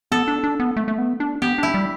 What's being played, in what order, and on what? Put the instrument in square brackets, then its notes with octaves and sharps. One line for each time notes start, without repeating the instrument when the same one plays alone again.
[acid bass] B3 [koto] A4
[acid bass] D4
D4
B3
A3
A3
B3
D4
[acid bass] B3 [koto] G4
[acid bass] D4 [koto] E4
[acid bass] G3